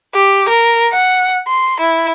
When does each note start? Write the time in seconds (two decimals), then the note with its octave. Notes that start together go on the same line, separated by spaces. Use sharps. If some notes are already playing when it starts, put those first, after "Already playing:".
0.15 G4
0.49 A#4
0.92 F#5
1.48 C6
1.80 E4